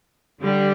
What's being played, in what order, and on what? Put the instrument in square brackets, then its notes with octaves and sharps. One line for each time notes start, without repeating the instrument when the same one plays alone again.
[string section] D3 G3